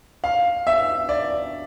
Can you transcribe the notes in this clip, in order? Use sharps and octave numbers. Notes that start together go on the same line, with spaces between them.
F5
E5
D5